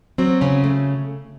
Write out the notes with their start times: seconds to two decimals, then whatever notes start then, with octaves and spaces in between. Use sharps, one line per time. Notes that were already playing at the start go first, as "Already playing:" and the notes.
0.18 F#3 C4
0.41 C#3 C#4
0.64 A3